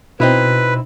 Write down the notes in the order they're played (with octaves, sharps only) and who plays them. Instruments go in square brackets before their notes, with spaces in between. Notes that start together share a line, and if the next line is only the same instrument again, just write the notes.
[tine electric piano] B2 [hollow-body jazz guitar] C4 D#4 E4 [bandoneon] B4